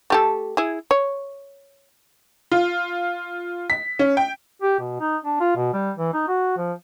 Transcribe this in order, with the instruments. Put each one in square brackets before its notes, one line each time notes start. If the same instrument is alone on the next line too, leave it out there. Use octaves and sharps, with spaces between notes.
[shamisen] A3 G4 A4
E4 G#4
C#5
[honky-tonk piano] F4
B6
C#4
G5
[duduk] G4
B2
D#4
D4
F4
B2
G3
E3
D#4
F#4
F3